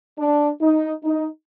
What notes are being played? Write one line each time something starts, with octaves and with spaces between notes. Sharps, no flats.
D4
D#4
D#4